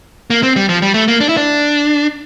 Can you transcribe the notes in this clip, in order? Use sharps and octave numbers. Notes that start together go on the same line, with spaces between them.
A#3
C4
G3
F3
G3
A3
A#3
D4
E4
D4